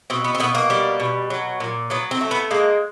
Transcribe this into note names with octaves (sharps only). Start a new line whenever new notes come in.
B2 C4
B3
C4
B2 B3
A#3
G3
B2
F#3
A#2
F#3 B3
C4
A3
B3
G#3 A#3